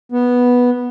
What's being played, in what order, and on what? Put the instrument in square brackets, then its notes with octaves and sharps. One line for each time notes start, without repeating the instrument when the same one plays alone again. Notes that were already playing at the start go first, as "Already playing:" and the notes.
[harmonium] B3